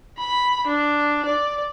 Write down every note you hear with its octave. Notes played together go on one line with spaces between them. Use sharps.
B5
D4
D5